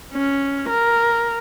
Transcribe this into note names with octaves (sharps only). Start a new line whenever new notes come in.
C#4
A#4